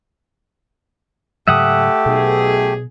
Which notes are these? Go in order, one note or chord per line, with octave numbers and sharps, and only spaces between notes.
G#2 C#3 F#3 A3 G4 E5 F#5 D#6
B1 B2 G#4